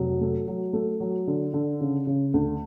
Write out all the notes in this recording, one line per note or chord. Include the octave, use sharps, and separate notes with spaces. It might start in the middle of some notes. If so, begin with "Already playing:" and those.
Already playing: F1 F#3
A3
F#3
A3
F#3
D3
D3
C#3
C#3
D2